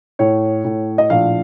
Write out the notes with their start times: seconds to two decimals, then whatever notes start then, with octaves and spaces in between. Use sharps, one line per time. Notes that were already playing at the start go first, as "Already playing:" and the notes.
0.19 A2 C#5
0.64 A2
0.98 D#5
1.10 A#1 F5